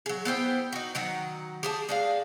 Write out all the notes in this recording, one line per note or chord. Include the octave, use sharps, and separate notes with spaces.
F#3 G#4
B3 E4 C5 G5
D#4 F#4
D#3 F#3 F#5
G4 G#4 A5
G#3 D4 F5